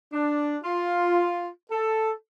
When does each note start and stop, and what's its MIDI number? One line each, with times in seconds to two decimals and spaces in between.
0.13 0.57 62
0.64 1.47 65
1.71 2.12 69